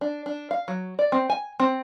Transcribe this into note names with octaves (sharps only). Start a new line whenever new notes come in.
D4
D4
F5
F#3
D5
C4
G#5
C4